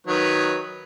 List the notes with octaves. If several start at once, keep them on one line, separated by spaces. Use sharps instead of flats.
D#3 F#3 B4